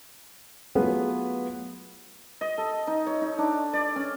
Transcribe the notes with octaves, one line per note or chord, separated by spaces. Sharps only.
F#3 A3 B3 F4 G#4 B4
D#5
A4
D#4
C#5
D#4
D4
D5
C#4